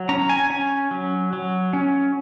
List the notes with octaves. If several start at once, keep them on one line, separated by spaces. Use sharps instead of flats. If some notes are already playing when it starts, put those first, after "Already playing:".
Already playing: F#3
C#4 A#5
G#5
C#4 G#5
F#3
F#3
C#4